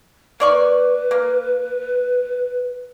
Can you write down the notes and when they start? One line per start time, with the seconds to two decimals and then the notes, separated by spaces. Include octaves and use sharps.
0.40 A#3 B4 D5 C#6
1.11 A#3